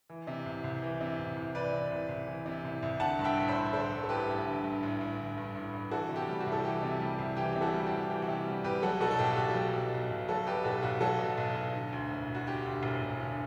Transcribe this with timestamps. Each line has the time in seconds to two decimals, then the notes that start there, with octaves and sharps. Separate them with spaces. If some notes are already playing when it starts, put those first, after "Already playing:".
0.10 E3
0.27 C3
0.46 C2
0.64 C2
0.82 E3
1.01 C3
1.19 C2
1.36 C2
1.55 E3 B4 D5
1.72 C3
1.91 C2
2.09 C2
2.27 E3
2.46 C3
2.64 C2
2.83 C2
3.00 D3 F#5 A5
3.19 G2
3.24 E5 G5
3.37 A1
3.48 C5 E5
3.55 A1
3.73 D3 A4 C5
3.92 G2
4.03 A4
4.09 A1 G4 B4
4.27 A1
4.45 D3
4.64 G2
4.83 A1
5.01 A1
5.19 D3
5.38 G2
5.56 A1
5.73 A1
5.91 E3 F#4 A4
6.09 C3
6.16 G4
6.28 G3
6.40 F#4
6.46 C2
6.52 A4
6.64 E3 G4
6.83 C3
7.01 G3
7.19 C2
7.37 E3 G4
7.55 C3
7.61 F#4 A4
7.74 G3
7.86 G4
7.91 C2
8.10 E3 G4
8.22 F#4
8.28 C3 G4
8.46 G3
8.64 C2 G4 B4
8.82 F#3 F#4 A4
9.00 B2 F#4 A4
9.11 A4
9.19 B1 G4
9.37 B1 F#4
9.48 A4
9.55 F#3 G4
9.74 B2
9.93 B1
10.10 B1
10.28 F#3 F#4 A4
10.47 B2 G4 B4
10.64 B1 F#4 A4
10.83 B1 F#4
11.01 F#3 F#4 A4
11.19 B2
11.38 B1
11.55 B1
11.74 D3
11.93 D2
12.11 E1
12.28 E1
12.35 F#4
12.47 D3 G4
12.65 D2
12.83 E1
13.02 E1
13.20 D3